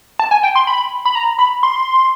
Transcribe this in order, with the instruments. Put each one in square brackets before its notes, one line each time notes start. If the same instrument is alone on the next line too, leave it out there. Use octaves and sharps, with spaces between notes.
[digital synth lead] A5
G#5
G5
C6
B5
B5
A#5
B5
C6